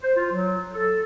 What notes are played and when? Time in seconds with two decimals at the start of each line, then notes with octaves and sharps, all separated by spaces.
0.02 C5
0.15 F4
0.33 F#3
0.73 A4